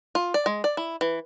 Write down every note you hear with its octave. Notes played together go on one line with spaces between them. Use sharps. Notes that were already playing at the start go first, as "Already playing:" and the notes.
F4
D5
G#3
D5
E4
E3